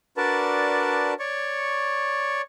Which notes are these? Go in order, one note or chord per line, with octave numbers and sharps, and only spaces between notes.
D4 F#4 A#4 B4 D5 A5
C#5 D5 C#6